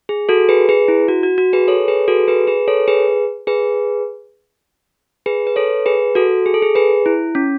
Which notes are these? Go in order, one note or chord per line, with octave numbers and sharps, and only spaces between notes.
G#4
F#4 A4
G#4 B4
G#4 B4
E4
F#4
F#4
F#4
G#4 B4
A4 C#5
G#4 B4
F#4 A4
G#4 B4
G#4 B4
A4 C#5
G#4 B4
G#4 B4
G#4 B4
B4
A4 C#5
G#4 B4
F#4 A4
G#4
A4
G#4
G#4 B4
E4
C#4